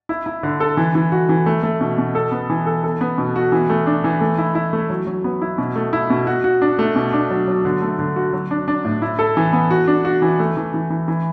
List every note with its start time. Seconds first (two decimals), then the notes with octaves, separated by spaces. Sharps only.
0.09 E4
0.26 E4
0.43 D3
0.60 A4
0.77 E3
0.95 E3
1.12 F#4
1.29 E3
1.46 A3
1.63 A3
1.81 B2
1.98 B2
2.15 A4
2.32 B3
2.49 E3
2.67 A4
2.84 A4
3.01 B3
3.18 B2
3.36 F#4
3.52 E3
3.70 A3
3.87 D4
4.04 E3
4.21 A3
4.38 E4
4.55 E4
4.73 A3
4.90 F#3
5.07 F#3
5.24 B3
5.42 E4
5.58 B2
5.76 A3
5.93 E4
6.10 B2
6.27 F#4
6.44 F#4
6.62 D4
6.79 A3
6.96 B2
7.13 D4
7.30 F#3
7.47 F#3
7.65 D3
7.82 A3
7.99 D3
8.16 F#4
8.33 F#3
8.51 D4
8.68 D4
8.85 A2
9.02 E4
9.19 A4
9.37 E3
9.53 B3
9.71 F#4
9.87 D4
10.05 F#4
10.22 E3
10.39 A3
10.57 E3
10.74 E3
10.90 E3
11.08 E3